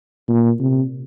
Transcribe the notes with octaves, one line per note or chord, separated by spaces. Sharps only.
A#2
C3